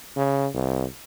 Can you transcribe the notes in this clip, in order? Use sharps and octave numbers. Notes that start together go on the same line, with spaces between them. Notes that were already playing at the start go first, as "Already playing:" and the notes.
C#3
C2